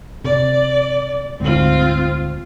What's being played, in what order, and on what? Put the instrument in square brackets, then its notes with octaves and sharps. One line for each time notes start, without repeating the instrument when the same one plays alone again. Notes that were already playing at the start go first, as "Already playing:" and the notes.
[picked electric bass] C3 [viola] D5
[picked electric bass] D2 G#2 [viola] C4 F4